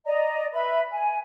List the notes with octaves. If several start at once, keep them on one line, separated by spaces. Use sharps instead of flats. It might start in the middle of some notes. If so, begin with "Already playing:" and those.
D5 D#5 A#5
B4 E5 B5
G#5